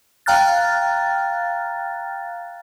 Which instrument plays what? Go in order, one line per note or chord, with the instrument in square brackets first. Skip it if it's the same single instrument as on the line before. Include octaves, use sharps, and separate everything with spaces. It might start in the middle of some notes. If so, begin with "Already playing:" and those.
[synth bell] F5 G5 A#5 F6 F#6 A6